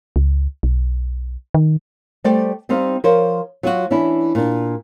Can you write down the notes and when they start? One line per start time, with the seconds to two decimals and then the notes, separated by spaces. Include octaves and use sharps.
0.16 C#2
0.63 B1
1.54 D#3
2.24 G3 A3 C5 D5 G5
2.69 G3 C4 D#4 C5 F5
3.04 F3 A#4 C5 C#5
3.63 F#3 F4 F#4
3.91 E3 C#4 D4 E4
4.35 A#2 D4